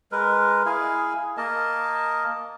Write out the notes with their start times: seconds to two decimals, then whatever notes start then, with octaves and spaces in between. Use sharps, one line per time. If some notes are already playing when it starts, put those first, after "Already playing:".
0.12 G#3 A#4 B4
0.66 E4 G#4 F5 G#5
1.37 A#3 A#4 D#5 A5